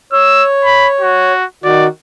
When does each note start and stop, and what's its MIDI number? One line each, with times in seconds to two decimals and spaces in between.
0.13 1.33 73
0.13 0.44 88
0.64 0.88 83
1.01 1.45 66
1.64 1.87 51
1.64 1.87 66
1.64 1.86 74